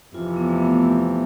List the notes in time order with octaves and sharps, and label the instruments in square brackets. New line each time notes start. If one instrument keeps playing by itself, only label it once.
[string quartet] F2 C3 E3 [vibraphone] F4
[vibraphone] B3
A3
B3